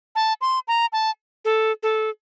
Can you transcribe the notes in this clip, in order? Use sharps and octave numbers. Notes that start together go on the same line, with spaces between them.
A5
C6
A#5
A5
A4
A4